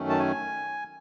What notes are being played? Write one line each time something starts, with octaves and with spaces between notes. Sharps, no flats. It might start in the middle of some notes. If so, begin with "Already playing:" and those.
Already playing: F#2 D#3 A3 C#4
A5
G#5